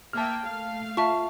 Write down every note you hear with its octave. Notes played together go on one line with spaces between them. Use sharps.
A#3 E5 G5 A5 F6
A3 F5
F4 E5 A5 C#6